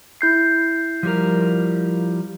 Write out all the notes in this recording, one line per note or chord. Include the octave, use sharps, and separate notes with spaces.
E4 G6 C7
F3 G3 A#4